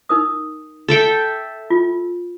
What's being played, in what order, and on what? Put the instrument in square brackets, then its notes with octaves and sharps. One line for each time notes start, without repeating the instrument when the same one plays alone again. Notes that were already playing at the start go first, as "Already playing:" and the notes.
[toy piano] D#4 A#4 D#6
[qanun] A4 E5 G5
[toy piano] F4